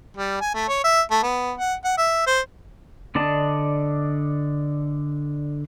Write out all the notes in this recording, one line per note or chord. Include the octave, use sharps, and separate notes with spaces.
G3
G#5
A3
C#5
E5
A3
B3
F#5
F#5
E5
C5
D3 D4 D5 D#5 A5